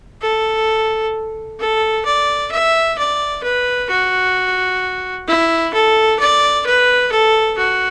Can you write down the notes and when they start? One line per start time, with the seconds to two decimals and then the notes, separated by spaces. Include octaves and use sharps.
0.22 A4
1.60 A4
2.06 D5
2.52 E5
2.98 D5
3.44 B4
3.89 F#4
5.28 E4
5.74 A4
6.20 D5
6.66 B4
7.12 A4
7.58 F#4